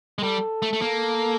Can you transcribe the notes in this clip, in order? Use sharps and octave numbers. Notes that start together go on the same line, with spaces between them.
G#3
G3 A4
A3
A3
A#3